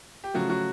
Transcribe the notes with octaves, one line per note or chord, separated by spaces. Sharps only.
G4
C#3 F3 F#3 A3 F#4
F#3 F#4